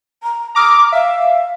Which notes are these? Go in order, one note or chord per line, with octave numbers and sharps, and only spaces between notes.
A#5
A#5 D6 D#6 F6
E5 F5